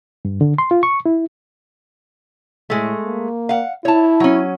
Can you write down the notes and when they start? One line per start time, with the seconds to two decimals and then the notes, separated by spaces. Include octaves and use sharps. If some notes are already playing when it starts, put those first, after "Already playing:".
0.25 G2
0.41 D3
0.58 C6
0.71 F4
0.83 C#6
1.06 E4
2.70 A2 G#3 A3
3.04 A#3
3.49 F5 F#5
3.85 E4 C#5 A5
4.20 F#3 C#4